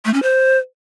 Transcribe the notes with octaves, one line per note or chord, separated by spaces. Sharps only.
A3
C#4
C5